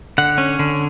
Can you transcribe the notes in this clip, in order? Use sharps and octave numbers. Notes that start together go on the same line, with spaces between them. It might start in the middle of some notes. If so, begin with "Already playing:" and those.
D3 F#5
C#4
D3